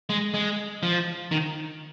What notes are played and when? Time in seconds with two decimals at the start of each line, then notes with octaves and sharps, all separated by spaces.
0.10 G#3
0.34 G#3
0.83 F3
1.31 D#3